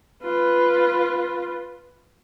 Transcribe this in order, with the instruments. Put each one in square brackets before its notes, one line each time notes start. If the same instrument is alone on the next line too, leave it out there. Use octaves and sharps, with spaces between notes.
[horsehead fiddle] F4 B4